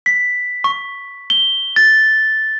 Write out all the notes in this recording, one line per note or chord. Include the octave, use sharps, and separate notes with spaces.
B6
C#6
G7
A6